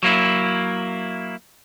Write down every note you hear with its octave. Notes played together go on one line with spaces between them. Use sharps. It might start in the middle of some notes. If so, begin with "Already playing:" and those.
F#3 A#3 E4